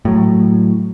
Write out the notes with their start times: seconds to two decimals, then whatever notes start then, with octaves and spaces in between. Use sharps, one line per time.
0.05 A2 F#3